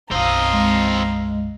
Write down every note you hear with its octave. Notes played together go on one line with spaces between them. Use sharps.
B1 F#2 C4 D#5 F5 A#5
G#3